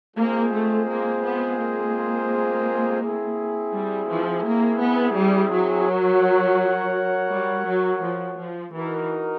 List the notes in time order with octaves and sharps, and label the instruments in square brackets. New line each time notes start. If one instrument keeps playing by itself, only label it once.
[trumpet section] G#3 C4 F4 G#4 C5 [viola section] A#3
[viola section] A3
A#3
B3
A#3
[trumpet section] C4 E4 G#4
[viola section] G3
F3
A#3
B3
G3
F#3
[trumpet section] F#4 A#4 C#5 F#5
[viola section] G3
F#3
F3
F3
[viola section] E3 [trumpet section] D#4 F#4 A#4